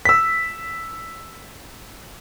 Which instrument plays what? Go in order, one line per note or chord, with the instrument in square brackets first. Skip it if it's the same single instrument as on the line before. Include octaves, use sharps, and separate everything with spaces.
[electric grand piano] E6 B6